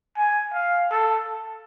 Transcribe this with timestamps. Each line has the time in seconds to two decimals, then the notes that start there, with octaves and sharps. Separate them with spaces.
0.17 G#5
0.54 F5
0.91 A4